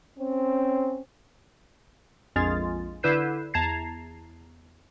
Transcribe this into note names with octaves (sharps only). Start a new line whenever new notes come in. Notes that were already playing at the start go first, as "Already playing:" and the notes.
C4 C#4
A#1 F2 G#3 F4 G#4 A6
D3 E4 B4 G6 C7 E7
E2 A5 A#5 G#6 A6 C7